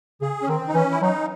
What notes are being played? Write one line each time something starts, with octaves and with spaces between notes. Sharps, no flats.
C#3 G#4
C#4
D#3 C4
D#4
E3 C#4
E4
F#3 D#4